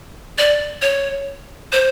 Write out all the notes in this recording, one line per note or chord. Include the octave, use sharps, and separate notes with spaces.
D5
C#5
C5